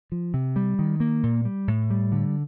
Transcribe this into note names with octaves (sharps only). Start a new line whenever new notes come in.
F3
C3
G3
D#3
A#3
A#2
G3
A2
G3
D3